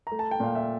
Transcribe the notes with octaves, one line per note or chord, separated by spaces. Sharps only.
A3 A#5
A5
G5
A#2 F5
E5